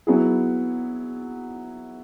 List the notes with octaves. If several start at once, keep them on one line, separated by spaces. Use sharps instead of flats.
F#3 B3 E4 G#4